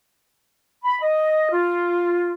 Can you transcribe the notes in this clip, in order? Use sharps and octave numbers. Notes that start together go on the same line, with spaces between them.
B5
D#5
F4